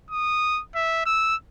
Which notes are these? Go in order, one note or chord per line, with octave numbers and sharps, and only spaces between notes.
D#6
E5
E6